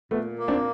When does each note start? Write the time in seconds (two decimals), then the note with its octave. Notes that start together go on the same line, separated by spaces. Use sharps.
0.11 A#2 A3 B3
0.39 A#3
0.48 C4 D4